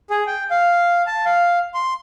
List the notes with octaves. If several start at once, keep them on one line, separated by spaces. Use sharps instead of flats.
G#4
G5
F5
A5
F5
C6